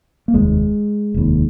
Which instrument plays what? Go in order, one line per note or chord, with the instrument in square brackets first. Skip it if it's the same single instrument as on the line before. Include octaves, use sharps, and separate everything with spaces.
[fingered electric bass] A#3
F1 D#2 G#3
F1 D#2